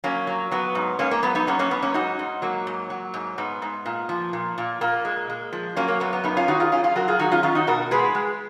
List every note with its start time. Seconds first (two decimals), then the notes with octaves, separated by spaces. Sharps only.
0.04 F#3 A#3 C#4
0.27 F#3
0.51 F#3 B3
0.75 G#2
0.99 G#2 A#3 C#4
1.11 A#3
1.23 F#3 B3
1.35 B3 D#4
1.47 F#3 A#3 C#4
1.59 A#3 C#4
1.71 F#3 B3
1.82 A#3 C#4
1.94 G#2 D#4 F#4
2.19 G#2
2.42 F#3 A#3
2.67 G#2
2.90 F#3
3.14 G#2
3.38 G#2 B3
3.62 G#2
3.86 A#2
4.09 F3
4.33 A#2
4.58 A#2
4.81 A#2 A#3
5.05 G#3
5.29 G#3
5.52 F3
5.76 F#3 A#3 C#4
5.88 A#3
6.00 F#2 B3
6.13 B3
6.24 F#2 B3 D#4
6.37 C#4 F4
6.48 D#3 D#4 F#4
6.60 F4 G#4
6.72 F#2 C#4 F4
6.84 C#4 F4
6.96 F#3 F#4 A#4
7.08 F4 G#4
7.19 D#3 D#4 F#4
7.31 C#4 F4
7.43 D#3 C#4 F4
7.55 D#4 F#4
7.67 B2 F#4 A#4
7.91 G#3 G#4 B4
8.15 G#3